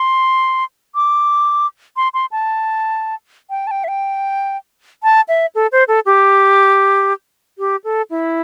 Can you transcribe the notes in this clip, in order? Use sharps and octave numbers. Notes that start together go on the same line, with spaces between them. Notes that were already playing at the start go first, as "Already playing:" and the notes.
Already playing: C6
D6
C6
C6
A5
G5
A5
G5
E5
G5
A5
E5
A4
C5
A4
G4
G4
A4
E4